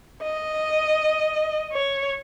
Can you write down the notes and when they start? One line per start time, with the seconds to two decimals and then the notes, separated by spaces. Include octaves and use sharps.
0.23 D#5
1.72 C#5